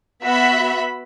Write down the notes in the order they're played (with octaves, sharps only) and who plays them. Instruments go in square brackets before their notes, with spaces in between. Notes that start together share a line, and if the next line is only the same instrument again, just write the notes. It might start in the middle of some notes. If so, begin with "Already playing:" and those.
[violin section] B3 F#4 E5 B5